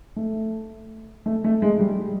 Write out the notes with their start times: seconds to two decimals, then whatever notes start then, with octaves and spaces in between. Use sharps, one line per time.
0.16 A3
1.26 A3
1.44 A3
1.62 G#3
1.80 G3